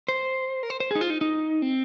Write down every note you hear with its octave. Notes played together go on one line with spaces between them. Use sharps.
C5
A#4
C5
C5
D#4 G#4
F4
D#4
D#4
C4